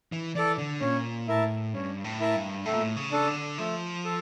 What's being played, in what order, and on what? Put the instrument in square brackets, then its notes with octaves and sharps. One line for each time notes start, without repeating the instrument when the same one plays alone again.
[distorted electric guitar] E3
[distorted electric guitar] E3 [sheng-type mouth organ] A4 D5
[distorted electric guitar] D3
[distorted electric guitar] A#2 [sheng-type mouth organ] C#4
[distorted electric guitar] A2 [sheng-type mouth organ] E4 A#4 E5 A5
[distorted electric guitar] G2 [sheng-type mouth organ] C#4
[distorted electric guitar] A2
[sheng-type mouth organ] E4 A#4 E5 A5
[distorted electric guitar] G2
[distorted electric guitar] A2 [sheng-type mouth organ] A3
[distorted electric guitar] A#2
A2
C#3
[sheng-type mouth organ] D4 A4
[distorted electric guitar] D3
[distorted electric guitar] F3 [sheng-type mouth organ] A3
[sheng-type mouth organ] A4